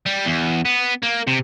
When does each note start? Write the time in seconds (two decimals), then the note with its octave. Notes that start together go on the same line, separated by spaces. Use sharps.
0.06 G3
0.25 E2
0.65 B3
1.03 A#3
1.27 C3